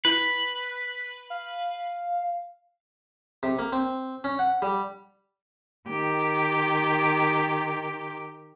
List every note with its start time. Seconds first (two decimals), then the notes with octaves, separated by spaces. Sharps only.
0.05 E4 B4
0.18 B6
1.30 F5
3.43 C3
3.59 A#3
3.73 C4
4.24 C#4
4.39 F#5
4.62 G3
5.87 D#3 G4